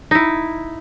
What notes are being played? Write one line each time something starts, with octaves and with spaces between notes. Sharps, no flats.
D#4 E4